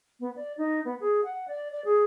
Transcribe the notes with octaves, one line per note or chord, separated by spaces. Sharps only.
B3
D5
D#4
B3
G#4
F#5
D5
D5
G#4